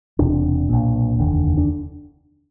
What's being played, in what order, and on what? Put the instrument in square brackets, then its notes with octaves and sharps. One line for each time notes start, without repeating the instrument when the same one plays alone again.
[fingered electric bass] E1 E2 C3 D4
B1 A#2
F1 D#2 D3
D4